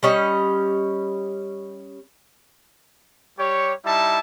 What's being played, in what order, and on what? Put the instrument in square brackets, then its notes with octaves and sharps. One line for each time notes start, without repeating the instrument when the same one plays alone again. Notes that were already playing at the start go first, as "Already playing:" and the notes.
[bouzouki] G3 C#4 D#5
[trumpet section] G3 G4 C#5
G3 D#4 E4 E5 A5